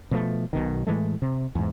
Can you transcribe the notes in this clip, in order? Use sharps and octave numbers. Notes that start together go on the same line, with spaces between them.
B2 F3 A3
B1 B2 D#3
A2 E3 G#3 A3
C3
E2 G#2